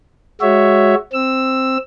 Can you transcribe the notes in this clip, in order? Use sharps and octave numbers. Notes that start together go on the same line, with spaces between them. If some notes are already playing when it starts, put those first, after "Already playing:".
G#3 F#4 C#5 E5
C4 E6